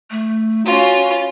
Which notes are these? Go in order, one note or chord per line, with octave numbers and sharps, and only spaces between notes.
A3
C#4 F4 F#4